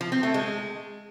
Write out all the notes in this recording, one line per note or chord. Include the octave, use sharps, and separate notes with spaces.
F3
C4
A3
G#3